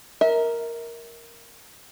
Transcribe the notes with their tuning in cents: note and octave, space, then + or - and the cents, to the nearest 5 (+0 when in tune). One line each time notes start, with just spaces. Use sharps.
A#4 +0 E5 -35